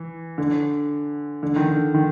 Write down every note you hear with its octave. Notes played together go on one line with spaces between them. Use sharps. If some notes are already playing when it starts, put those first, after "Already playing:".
Already playing: E3
D3
D3
D#3
D3
D#3